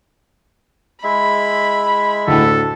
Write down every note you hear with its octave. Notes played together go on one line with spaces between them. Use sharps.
G#3 E4 E5 B5
D2 A2 A4